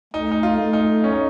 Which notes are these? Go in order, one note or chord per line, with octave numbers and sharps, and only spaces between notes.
A3 D#4
D#4
F4
A3
D#4
C#4
D#4